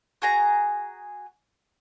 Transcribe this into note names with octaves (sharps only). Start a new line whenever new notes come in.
F#4 G#4 A#5